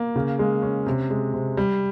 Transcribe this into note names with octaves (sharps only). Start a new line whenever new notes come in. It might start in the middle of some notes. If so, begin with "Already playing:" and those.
Already playing: A#3
C#3
G#3
C#4
C3
G#3
C3
G3